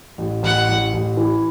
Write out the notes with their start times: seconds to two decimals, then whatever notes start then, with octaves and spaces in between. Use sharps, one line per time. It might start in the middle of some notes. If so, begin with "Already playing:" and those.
0.18 A1
0.43 A1 F#5
0.69 A1
0.93 A1
1.17 E3